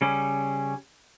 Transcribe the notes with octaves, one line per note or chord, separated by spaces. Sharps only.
C#3 G3 C#4